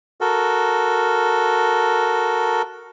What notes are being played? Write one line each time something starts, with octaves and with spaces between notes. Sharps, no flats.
F#4 A4 A#4